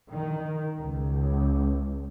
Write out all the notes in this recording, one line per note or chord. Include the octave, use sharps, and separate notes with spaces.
D#3
C#2